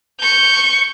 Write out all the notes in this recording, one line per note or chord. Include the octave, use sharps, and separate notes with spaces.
C#6 G6